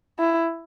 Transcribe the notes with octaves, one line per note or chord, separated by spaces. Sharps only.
E4